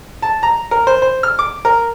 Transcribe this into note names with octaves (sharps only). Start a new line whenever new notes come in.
A5
A#5
A#4
C5
C5
F6
D6
A#4